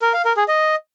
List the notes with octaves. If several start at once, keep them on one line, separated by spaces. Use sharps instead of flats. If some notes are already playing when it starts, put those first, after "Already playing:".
A#4
F5
A#4
G#4
D#5